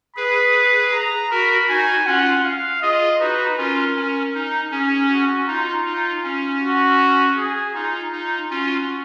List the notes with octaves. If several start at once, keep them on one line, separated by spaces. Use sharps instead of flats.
G#4 B4 B5
A#5
F#4 A#4 B5
D#4 F#4 G#5
C#4 F4 F#5
F5
F4 G#4 D#5
D#4 F#4 B4
C#4 F4 A#4
C#4
D#4
C#4 G#4
F#4
D#4 F4
D#4
C#4
F#4
G#4
D#4 F4
D#4
C#4 F4 F#4